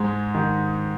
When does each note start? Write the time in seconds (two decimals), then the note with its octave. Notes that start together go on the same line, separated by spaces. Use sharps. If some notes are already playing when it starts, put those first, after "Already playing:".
Already playing: G#2 G#3
0.35 D#3